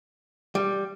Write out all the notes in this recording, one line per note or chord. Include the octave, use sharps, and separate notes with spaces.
G3